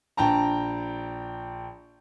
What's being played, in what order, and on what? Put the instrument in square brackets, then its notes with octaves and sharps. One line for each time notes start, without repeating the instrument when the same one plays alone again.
[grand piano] A#1 G5 A5 A#5